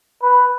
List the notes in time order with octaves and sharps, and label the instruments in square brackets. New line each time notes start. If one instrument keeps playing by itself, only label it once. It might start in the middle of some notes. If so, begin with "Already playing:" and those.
[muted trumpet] B4